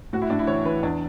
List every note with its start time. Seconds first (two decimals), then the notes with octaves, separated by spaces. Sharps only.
0.13 A2 F#4
0.22 E4
0.30 A2 D4
0.39 E4
0.47 E3 C#5
0.65 E3 B4
0.83 E2 D4